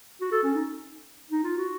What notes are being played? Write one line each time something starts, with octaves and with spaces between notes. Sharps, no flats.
F#4
A4
C#4
D#4
D#4
F4
F#4